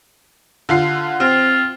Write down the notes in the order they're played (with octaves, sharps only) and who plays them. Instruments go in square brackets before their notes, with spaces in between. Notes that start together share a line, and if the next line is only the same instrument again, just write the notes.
[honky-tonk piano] D3 F4 C7
[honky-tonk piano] C4 [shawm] F4